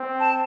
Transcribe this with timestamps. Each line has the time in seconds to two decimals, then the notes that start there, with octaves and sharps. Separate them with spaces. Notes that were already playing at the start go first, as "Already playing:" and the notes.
Already playing: C4
0.20 A5